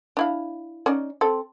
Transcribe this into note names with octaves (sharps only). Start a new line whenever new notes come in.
D4 E4 F5
C#4 D#4 D5
C4 A4